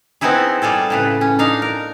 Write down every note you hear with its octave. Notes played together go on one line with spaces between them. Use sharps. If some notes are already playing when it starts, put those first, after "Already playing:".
B3 C4 D#4 E4 G#4
G3 F4 G#4 A4
A2 C#3 B4
C#4
D4 D#4 F5
A#4